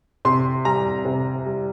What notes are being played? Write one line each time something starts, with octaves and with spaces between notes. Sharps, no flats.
C3 C6
G3 A#5
C3
G3